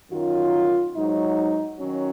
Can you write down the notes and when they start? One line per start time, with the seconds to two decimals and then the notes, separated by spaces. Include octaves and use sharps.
0.11 F#2 D#3 F#3 F4
0.96 G#2 F#3 D#4
1.79 D#3 F#3 C#4